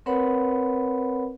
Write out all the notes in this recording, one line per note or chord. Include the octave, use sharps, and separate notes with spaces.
C4 A#4 B4 C#5 F#5 B5